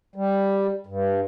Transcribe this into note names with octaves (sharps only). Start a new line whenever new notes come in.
G3
G2